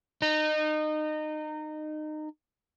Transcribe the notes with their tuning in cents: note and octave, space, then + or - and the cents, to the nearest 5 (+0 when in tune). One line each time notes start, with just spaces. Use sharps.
D#4 -25